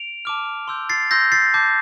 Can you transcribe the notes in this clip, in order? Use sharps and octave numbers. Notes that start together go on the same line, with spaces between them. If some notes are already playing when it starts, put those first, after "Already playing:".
Already playing: D7 F7
A5 D6 F6
C6 E6 G6
A6 C7
C6 E6 G6 A#6
A6 C7
A5 D6 G6